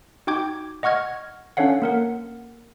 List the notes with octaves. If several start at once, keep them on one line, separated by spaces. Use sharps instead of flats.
D#4 F#4 G5 D6 G6 G#6
D#5 F#5 C#6 F6 G#6
C#4 D4 A4 C#5 F5 F#5
A#3 A#4 F#5